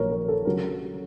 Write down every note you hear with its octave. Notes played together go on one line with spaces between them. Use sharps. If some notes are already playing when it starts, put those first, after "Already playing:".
Already playing: A#1 A#2 F#3 A#4 C#5
A#4
A4
C#3 F#3 A#4